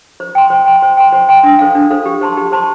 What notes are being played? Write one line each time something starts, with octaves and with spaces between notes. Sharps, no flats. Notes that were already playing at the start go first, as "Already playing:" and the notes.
C5
G5 C6
C5
G5 C6
C5
G5 C6
C5
G5 C6
D4
A4 C5 F5
D4
A4 C5 F5
G4
C5 A5 C6
G4
C5 A5 C6